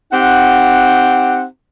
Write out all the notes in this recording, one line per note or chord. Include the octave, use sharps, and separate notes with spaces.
C4 D#4 G4 F#5